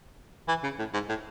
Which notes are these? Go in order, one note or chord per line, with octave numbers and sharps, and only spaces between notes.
E3
C#3
A2
G#2
A2